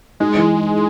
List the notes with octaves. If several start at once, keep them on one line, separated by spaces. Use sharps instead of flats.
G#3 D#4
E3